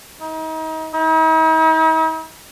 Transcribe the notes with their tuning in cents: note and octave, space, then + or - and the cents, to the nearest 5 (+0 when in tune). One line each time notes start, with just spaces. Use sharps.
D#4 +35
D#4 +45